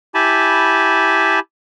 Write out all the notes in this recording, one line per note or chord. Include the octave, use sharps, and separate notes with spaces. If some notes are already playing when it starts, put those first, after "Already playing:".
E4 G4 G#5 A5 B5